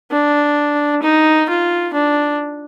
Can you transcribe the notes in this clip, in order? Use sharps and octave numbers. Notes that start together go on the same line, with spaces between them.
D4
D#4
F4
D4